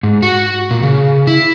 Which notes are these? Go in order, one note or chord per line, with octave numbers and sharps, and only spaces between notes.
G#2
F#4
A#2
C#3
E4